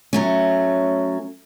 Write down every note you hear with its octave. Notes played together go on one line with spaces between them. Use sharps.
F#3 A3 C#4